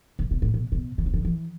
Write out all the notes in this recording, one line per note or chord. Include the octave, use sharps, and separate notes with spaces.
C3
B2
A2
B2
B2
D3
C3
D3
E3